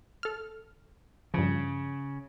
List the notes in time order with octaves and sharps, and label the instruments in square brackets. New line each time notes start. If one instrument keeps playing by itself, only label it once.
[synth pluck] A4 F6
[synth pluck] G2 F3 [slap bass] C#3